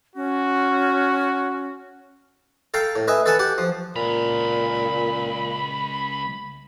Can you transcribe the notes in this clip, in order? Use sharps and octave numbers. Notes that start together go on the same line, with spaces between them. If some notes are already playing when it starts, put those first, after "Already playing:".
C#4 F#4
A4 F5 G5 A#5
A2
B4 D#5 E5 G#5
A4 B4 F#5 G#5 A5
G4 F#5
F3
C#2 A#2 A#5 B5